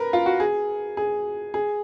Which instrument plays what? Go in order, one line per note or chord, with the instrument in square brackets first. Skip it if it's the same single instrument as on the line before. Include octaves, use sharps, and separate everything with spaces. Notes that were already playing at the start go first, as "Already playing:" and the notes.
Already playing: [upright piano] A#4 B4
F4
F#4
G#4
G#4
G#4